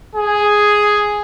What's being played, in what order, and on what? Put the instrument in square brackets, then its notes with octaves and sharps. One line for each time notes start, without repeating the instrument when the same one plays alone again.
[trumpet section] G#4